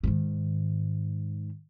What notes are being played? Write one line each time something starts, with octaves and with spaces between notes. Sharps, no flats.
G#2 D#3